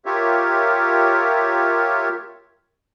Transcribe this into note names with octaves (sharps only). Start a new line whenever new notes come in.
F4 G4 A#4 C#5 E5